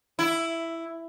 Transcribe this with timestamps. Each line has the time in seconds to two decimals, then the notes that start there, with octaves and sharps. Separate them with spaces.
0.19 E4